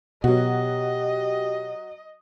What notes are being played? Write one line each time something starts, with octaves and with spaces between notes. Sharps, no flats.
B2 F#3 F#4 G4 D#5